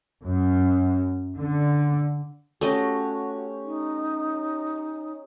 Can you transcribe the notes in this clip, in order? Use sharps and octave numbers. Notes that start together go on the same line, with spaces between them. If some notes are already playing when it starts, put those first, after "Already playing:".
F#2
D3
A3 C#4 F#4 G4 C#5 D#5
D#4